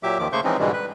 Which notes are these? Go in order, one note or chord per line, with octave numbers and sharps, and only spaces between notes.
A#2 F#3 G4 E5 D6
D#2 D#3 F3 D6
C#3 A3 A#3 C5 C#6 G6
E3 F3 G#3 C4 C#4 D#4
G#2 B2 D3 E3 G3 G#3
B4